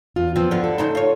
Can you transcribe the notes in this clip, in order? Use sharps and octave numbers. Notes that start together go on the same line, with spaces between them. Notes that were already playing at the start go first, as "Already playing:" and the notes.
E2 F4
F3 B3 C4
G2 D3 F4
A4
C#3 D#4 C5
F4 C#5